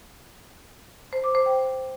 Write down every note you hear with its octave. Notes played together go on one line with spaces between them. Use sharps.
C5
D6
C5
G5